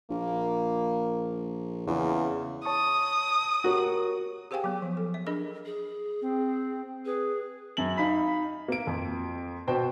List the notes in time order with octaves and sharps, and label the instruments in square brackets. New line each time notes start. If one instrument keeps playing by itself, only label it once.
[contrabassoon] A#1 [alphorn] A#3
[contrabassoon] E2 [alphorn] C#3
[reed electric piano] C#5 A5 C#6 [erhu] D#6
[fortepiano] F#4 [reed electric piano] G4 A#4 C#5
[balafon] G4 G#4 C5 F5 G5 G#5
F#3 B3
F3
A4
E5
D4 G#4 A#4 D#5 B5
[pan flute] G#4
[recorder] C4
[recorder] G#4 [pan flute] B4
[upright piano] F#2 F#7
D#4 F5 B5 B6
A#3 D7
F2
B2 F#4 C5 G5